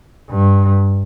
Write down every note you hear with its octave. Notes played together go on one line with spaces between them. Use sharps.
G2